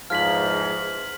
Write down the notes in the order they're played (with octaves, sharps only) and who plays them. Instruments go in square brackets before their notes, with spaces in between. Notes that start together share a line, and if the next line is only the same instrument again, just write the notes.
[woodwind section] E2 G#2 F3 [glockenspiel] F6 B6 F#7